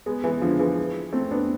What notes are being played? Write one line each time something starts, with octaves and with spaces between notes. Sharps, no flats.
G#3 B3
E3 G#3
D3 F3
E3 G#3
A3 C4
B3 D4